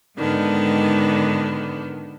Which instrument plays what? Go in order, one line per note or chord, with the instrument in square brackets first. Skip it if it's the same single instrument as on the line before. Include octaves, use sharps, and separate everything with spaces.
[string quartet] G#2 D3 D#3 B3 D4